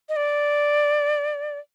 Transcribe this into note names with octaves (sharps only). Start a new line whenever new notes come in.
D#5
D5